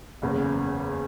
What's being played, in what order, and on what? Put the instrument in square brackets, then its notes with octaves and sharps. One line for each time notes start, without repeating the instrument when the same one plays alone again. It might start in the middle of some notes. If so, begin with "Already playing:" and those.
[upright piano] F#1 E2 C#3